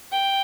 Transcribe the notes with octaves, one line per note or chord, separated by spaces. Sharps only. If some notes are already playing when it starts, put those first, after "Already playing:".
G5